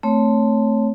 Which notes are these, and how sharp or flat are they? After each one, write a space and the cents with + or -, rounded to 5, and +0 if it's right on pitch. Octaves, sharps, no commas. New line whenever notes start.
A3 +0 C4 -5 C#5 +0